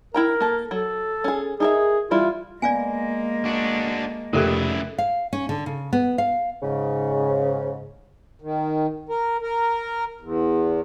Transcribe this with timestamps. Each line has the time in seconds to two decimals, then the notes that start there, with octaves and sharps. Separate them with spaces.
0.14 E4 A#4 G5 A#5
0.40 A#3 A4
0.71 F#3 A4
1.24 C#4 G#4
1.60 D#4 G#4 A#4 E5
2.11 E3 G3 E4 F4
2.62 G#3 A#3 B3 D5 F5 G#5
3.45 D4 F#4
4.33 F1 C#3 E4 G4 A4 A#4 E5 F#6
4.98 F5
5.33 C#4
5.49 D3
5.66 C#3
5.93 B3
6.18 F5
6.62 G#2 C#3
8.42 D#3
9.09 A#4
9.42 A#4
10.21 E2